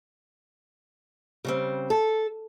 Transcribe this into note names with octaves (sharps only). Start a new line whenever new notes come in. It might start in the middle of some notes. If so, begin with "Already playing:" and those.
C#3 G3 C4
A4